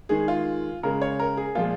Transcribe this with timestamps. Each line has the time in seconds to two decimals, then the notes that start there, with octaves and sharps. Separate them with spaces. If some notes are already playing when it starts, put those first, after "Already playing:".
0.09 D#3 G#3 G#4
0.28 F4
0.83 C#3 G#3 A#4
1.01 C#5
1.19 A#4
1.37 G#4
1.55 A#2 F3 G#3 F4